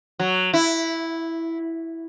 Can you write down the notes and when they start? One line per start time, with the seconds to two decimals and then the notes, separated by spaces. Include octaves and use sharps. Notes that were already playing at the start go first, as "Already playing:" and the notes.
0.19 F#3
0.54 E4